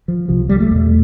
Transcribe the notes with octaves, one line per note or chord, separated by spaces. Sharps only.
F3
C2 C3 F3
G3
A3
E2 B2